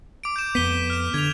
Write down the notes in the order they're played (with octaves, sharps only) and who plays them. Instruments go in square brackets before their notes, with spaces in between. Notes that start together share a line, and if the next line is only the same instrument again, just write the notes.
[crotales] D6 D7
G6 E7
[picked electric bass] F2 B3 [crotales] B6 D#7 G7
[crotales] F6 E7
[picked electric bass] D3 [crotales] G#6 F7